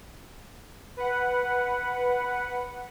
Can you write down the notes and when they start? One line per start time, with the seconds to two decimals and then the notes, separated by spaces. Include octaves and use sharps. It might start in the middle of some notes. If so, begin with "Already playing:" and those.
0.97 B4 F#5